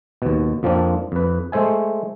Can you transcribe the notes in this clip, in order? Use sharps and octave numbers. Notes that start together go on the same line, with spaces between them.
D#2 B2
F2 F3 A#3 C4 D4 F4
F2 B4
G#3 A3 C5 E5 G#5